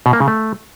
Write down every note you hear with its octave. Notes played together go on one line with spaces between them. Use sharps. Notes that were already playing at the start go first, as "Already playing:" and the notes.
B2
A#3
C#3
A3